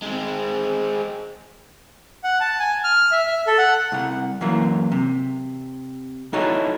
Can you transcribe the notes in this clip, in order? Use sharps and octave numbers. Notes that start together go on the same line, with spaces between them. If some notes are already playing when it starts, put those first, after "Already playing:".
G#3 C4
F#5
A5
G#5
F6
E5
E5
A4
F#5
C2 F#5
F#2 E3 F#3 A#3
C3
D#4 E4 F#4 A4 C#5 D#5